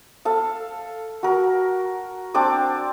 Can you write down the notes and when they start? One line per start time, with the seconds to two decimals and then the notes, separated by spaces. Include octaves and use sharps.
0.25 A4 F5
1.23 F#4 A#4
2.34 C4 D4 D5 D6